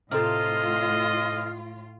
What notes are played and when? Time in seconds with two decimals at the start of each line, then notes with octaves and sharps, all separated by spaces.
0.11 A2 C3 C4 F4 A4 D#5 F6